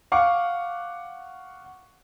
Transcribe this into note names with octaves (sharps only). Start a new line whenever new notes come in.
F5 F#5 C#6 D6